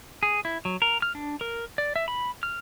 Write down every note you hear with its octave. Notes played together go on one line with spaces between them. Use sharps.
G#4
E4
F#3
A#4
F6
D4
A#4
D5
E5
B5
F6